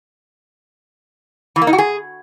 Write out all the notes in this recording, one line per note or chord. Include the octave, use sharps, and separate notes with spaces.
E3
A#3
D#4
F#4
G#4